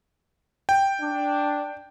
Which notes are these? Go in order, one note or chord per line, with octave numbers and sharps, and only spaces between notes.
G5
D4